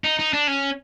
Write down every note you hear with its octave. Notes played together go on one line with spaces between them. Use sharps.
D#4
D#4
D4
C#4